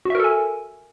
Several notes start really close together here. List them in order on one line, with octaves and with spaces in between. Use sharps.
F#4 E5 A#4 A4 G#5